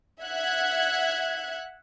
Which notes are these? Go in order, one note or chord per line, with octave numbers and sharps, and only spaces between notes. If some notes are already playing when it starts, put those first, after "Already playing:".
E5 F#5 F#6 G#6